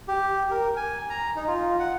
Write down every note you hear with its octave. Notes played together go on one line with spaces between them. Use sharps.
G4
A#4
G#5
A#5
D#4
F4
F#5